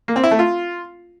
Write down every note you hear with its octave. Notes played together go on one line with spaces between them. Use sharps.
A#3
C4
E4
A3
F4